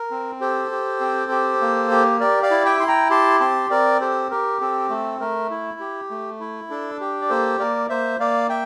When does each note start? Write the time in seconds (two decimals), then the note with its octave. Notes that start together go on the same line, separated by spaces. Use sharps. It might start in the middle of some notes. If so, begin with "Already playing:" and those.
Already playing: A#4
0.11 C4
0.41 G4 A4 C5
0.71 G4
1.01 C4
1.31 G4
1.61 A#3
1.91 G4
2.20 G4 A#4 D5
2.43 D5 F5
2.51 E4
2.65 E5 G5
2.80 E4 C6
2.88 G5 A#5
3.10 G4 A5 C6
3.40 C4 A5 C6
3.70 C4 A#4 D5
4.01 G4 A4 C5
4.31 G4 A#4
4.61 C4 A4
4.90 A3 A4
5.20 A3 A#4
5.50 E4
5.80 G4
6.10 A3
6.40 E4
6.70 D4 A4
7.00 G4
7.22 D5
7.29 A#3 A4 C5
7.59 A#3 A#4 D5
7.89 A#3 C5 E5
8.19 A#3 D5 F5
8.49 E5 G5